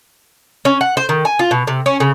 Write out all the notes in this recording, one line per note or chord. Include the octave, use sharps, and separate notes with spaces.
C#4
F#5
C5
D#3
G#5
F4
B2
C3
C#4
C#3